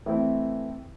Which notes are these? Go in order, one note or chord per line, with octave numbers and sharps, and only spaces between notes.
E3 A3 C4 E4